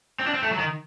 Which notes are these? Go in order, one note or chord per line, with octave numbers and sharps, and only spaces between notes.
C4
D4
C4
A3
F#3
D#3